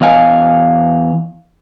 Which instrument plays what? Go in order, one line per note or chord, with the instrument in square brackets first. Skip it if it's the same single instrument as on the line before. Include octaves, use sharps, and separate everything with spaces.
[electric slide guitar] E2 D#5 F5 G#5